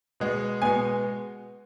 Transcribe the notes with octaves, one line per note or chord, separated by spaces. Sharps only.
B2 G#3 B3
B2 G#3 B3 G#5